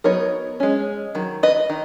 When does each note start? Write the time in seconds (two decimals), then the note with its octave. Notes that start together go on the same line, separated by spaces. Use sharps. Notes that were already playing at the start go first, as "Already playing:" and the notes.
0.04 F#3 B3 D#4 A#4 C#5
0.60 G#3 C#4
1.15 D#3 F#3
1.43 B4 D#5
1.70 D#3